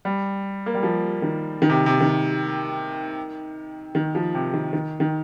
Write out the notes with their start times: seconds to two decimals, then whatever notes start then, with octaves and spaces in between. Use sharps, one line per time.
0.05 G3
0.66 A#3
0.75 G3
0.83 F3
1.22 D#3
1.62 D#3
1.69 C3
1.86 C3
2.01 D#3
3.95 D#3
4.15 F3
4.34 C3
4.54 D#3
4.73 D#3
5.00 D#3